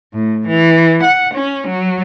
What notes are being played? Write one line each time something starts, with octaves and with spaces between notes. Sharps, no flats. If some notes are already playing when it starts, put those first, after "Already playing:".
A2
E3
F#5
C#4
F#3